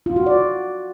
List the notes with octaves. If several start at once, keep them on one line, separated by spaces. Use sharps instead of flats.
F4
F#4
D5